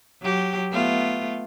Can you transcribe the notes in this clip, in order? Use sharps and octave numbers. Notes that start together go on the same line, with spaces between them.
F#3 G4
A3 B3 F4